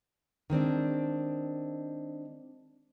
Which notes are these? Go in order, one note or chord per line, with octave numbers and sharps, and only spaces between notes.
D#3 G#3 C4 D4